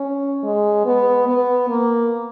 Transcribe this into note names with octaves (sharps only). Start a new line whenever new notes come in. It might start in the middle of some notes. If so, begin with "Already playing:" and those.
Already playing: C#4
G#3
B3
B3
A#3